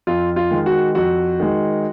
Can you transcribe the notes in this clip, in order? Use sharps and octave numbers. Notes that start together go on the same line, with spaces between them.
F2 F4
F4
D#3 G#3
F#4
F2 F#4
D#3 G#3